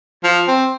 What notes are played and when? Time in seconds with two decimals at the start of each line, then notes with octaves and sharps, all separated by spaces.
0.24 F3
0.48 C4